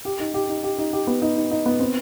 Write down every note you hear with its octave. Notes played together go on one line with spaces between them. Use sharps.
G4
D#4
G4
D#4
G4
D#4
G4
B3
D#4
D#4
D#4
B3
C4